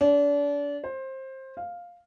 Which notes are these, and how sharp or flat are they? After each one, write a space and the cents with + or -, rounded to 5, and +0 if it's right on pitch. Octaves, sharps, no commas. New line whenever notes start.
D4 -35
C5 +20
F5 +5